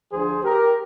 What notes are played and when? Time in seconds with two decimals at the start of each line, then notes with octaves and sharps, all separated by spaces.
0.12 D2 D3 F3 G#4 C5
0.44 G4 A#4